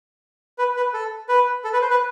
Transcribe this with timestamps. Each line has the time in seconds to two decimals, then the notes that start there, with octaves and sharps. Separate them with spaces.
0.58 B4
0.76 B4
0.94 A4
1.29 B4
1.64 A4
1.73 B4
1.82 C5
1.90 B4